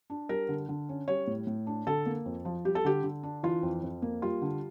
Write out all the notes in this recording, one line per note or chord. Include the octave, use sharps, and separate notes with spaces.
D4
G3 A#4
D3
D3
C#4
G3 C#5
A2
A2
D4
D3 A4
A#3
F2
F3
G3 G4
A4
D3 G4
D3
D4
E3 F4
F2
F2
A#3
G3 F4
D3